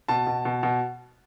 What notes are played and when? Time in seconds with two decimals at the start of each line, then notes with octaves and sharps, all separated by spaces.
0.08 B2 A5
0.26 B2
0.45 B2
0.63 B2